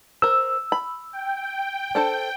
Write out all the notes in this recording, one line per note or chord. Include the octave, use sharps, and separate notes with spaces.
A#4 C5 E6
B5
G5
D4 A4 C5